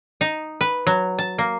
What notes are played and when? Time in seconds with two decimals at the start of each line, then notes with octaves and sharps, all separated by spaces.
0.21 D#4
0.61 B4
0.87 F#3
1.19 A5
1.38 A#3